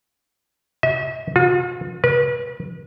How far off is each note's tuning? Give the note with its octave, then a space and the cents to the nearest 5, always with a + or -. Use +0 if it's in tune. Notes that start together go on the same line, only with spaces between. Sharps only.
E5 -40
F4 +45
B4 -40